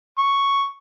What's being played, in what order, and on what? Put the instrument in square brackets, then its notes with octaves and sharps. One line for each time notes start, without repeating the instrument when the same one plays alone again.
[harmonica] C#6